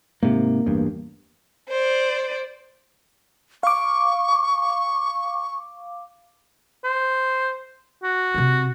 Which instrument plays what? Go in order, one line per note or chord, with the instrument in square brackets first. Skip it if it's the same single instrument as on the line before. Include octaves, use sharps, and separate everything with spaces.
[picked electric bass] G#2 C3 [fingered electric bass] A#3
[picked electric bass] A1 E2 G2
[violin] C5 D5
[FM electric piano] F5 D6 [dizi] C#6
[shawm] C5
F#4
[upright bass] C3 C4